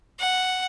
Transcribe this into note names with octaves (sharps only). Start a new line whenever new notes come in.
F#5